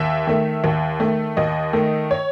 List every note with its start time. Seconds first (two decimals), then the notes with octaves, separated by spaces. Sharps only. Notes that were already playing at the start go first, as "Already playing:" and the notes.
Already playing: D#2 E5
0.27 D#3 A3
0.64 D#2
1.00 D#3 A3
1.37 D#2 D#5
1.73 D#3 A3
2.11 C#5